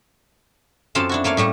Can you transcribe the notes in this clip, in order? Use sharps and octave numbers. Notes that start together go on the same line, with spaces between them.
F#2 C4 F4 A4 F5 A5
D4 E4 F#4
A3 A#3 C#5 F5
A2 G3 A3 G4